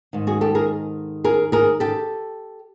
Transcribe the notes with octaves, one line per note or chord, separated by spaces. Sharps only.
G#2 D#3
F#4 G#4
G4 A4
G#4 A#4
G#4 A#4
G#4 A#4
G4 A4